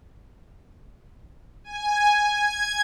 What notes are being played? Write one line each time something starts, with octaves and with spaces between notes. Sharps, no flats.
G#5
G#6